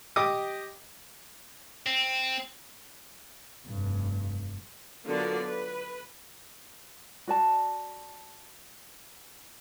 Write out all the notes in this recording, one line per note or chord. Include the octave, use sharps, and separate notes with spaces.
G4 D#5 D6 D#6
C4
F1 G2
D3 F#3 B3 F4 A#4 D5
B4
F#4 D5 A5